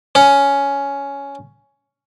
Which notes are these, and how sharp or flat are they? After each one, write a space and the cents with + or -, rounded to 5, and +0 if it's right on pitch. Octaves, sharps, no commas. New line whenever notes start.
C#4 +10